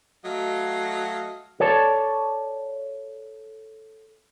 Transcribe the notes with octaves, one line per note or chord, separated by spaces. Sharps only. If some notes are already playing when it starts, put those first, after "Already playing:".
F#3 A3 D#5 F5
A4 C#5 D5 A5